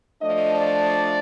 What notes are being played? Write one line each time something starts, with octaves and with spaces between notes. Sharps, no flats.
F3 A3 D4 D#5
D5